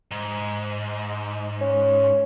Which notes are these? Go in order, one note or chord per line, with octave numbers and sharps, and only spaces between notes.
G#2
C#4